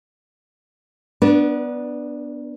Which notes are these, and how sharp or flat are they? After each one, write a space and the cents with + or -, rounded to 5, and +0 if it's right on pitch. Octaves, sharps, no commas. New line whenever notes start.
B3 +0 D4 +0 B4 -45